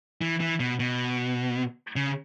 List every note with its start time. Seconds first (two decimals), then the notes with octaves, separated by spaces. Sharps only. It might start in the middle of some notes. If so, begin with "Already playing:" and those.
0.21 E3
0.40 E3
0.60 B2
0.79 B2
1.96 C#3